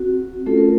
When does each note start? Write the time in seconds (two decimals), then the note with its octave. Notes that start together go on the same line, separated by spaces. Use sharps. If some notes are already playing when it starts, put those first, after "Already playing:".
Already playing: C4 F#4
0.46 A3 C#4 F4 A4
0.57 A#4